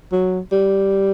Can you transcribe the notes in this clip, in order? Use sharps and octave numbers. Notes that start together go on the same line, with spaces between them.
F#3
G3